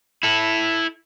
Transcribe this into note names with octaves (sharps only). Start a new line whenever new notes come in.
E4 A4